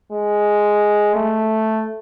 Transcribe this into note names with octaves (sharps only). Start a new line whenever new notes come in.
G#3
A3